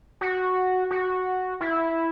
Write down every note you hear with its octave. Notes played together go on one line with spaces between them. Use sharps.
F#4
F#4
E4